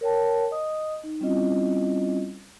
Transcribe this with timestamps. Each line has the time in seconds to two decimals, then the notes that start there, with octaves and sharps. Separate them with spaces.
0.01 A#4 C#5 G5 A5
0.51 D#5 D#6
1.04 D#4
1.21 G3 C4 C#4 E4 F4 D#5